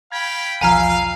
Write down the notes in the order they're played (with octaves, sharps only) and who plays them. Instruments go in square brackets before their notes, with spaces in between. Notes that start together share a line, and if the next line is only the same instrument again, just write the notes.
[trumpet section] F5 G5 B5 [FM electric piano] G#6
[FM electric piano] B1 E2 F3 [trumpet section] F5 [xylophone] G#5 A#5 F6